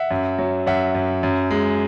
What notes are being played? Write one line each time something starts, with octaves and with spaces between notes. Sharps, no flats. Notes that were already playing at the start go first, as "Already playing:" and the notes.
Already playing: E5 F#5
F#2
F#3
F#2 E5 F#5
F#2
F#2
G#3